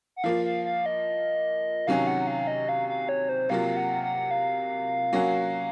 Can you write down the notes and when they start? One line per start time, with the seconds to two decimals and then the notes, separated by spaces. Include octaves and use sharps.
0.16 F#5
0.24 F3 A#3 F4 F5
0.45 F5
0.65 F5
0.86 D#5
1.87 C3 D#3 F#3 C#4 F5
2.07 F#5
2.27 F5
2.47 D#5
2.69 F5
2.89 F5
3.09 C#5
3.29 C5
3.49 C3 F#3 A#3 F4 F5
3.76 F#5
4.03 F#5
4.31 F5
5.13 F#3 A#3 C#4 F#4